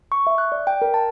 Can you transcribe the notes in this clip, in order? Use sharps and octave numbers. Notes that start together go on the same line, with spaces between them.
C#6
E5
F#6
D5
G5
A#4
A5